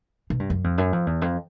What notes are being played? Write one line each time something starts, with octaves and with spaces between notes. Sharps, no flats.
B2
G2
F#2
F2
F#2
F2
E2
F2